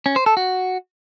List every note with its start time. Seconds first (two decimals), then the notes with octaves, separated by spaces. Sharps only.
0.06 C#4
0.16 C5
0.26 A4
0.37 F#4